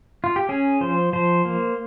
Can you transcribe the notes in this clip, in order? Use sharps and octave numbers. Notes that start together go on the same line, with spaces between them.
F4
G4
C#4 G#4
F3 C5
F3 C5
A#3